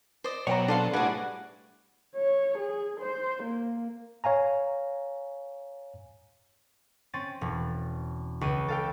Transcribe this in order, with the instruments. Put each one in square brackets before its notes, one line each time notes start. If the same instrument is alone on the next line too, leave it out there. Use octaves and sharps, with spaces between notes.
[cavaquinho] C5 D5 D#5
[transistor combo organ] B2 F#3 [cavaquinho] C5 F#5 [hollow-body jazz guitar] C#5 G5 A#5
[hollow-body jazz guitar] D4 F5 [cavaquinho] A4 C5 C6
[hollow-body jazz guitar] A2 G3 [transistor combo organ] D4 G#4 [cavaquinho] F#4 B4 [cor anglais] F#5
[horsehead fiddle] C#5
G#4
C5
A#3
[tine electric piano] C#5 F5 G#5 A#5
[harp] C4 C#4 A6 D#7
E1
C#2 D#7
A4 F5 G5